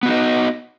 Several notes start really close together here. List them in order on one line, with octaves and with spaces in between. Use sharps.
B3 F#4 D#4 D#5